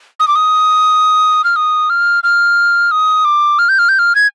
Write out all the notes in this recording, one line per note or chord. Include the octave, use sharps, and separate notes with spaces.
D#6
D6
D#6
F6
D#6
F6
F6
D#6
D6
F6
G6
F6
G6
F6
G#6